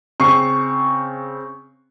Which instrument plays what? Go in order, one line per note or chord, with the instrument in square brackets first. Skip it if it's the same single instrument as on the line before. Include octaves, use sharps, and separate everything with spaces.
[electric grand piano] C#3 C4 C7 [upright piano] C#6